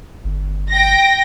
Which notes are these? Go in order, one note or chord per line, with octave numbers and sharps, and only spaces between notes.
G1
G5 A#6